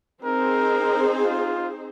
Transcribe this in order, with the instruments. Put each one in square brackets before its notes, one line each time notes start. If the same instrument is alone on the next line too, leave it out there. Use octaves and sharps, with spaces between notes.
[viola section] C4 D#4 G#4 C5 [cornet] A#4
[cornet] F4